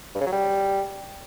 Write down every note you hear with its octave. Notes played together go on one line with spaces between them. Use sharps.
G2
C#3
F#3
G3